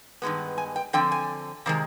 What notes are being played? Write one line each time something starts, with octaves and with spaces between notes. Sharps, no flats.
G2 D#3 G#3 B3
G#5
G5
D3 F3 C4 G5
G#5
C3 D#3 G#3